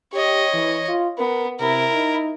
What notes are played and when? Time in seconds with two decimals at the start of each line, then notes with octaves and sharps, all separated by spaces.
0.13 G4 C#5 D#5
0.54 E3
0.88 F4
1.19 B3 A#4
1.60 C3 E4 A#4
1.94 D#4